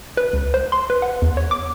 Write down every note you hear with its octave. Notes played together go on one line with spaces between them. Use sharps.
B4
C#2
C5
C6
B4
F#5
E2
C#5
D6